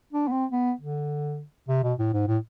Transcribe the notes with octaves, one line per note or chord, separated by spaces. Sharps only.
D4
B3
C4
B3
D3
C3
B2
A2
G#2
A2